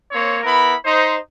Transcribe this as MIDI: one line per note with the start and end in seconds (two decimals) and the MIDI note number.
0.12 0.39 58
0.12 0.39 60
0.12 0.39 73
0.44 0.74 59
0.44 0.74 64
0.44 0.74 70
0.44 0.74 83
0.85 1.15 63
0.85 1.15 72